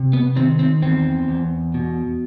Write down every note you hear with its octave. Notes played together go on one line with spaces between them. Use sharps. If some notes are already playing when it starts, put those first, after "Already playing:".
Already playing: C3
B3
D#3 C4
C4
E2 C4
E2
B2